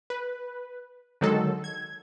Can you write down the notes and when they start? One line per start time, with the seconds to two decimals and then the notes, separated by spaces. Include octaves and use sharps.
0.10 B4
1.21 D3 D#3 F#3 G#3 A4
1.64 G#6